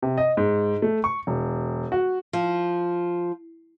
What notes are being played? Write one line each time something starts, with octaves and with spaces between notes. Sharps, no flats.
C3
D#5
G#2
A3
C#6
E1
F#4
F3